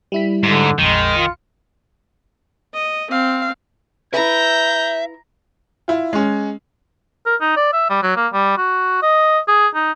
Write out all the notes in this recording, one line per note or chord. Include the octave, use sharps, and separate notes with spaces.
G3 E4 B6
G#2 D3
A#1 F2 D#3 G#3
F4 C#7
D#5
C4 F5
E4 B4 E5 A#5 G6
E4 F4
G#3 C#4
A#4
D#4
D5
E5
G3
F#3
A#3
G3
F#4
D#5
G#4
D#4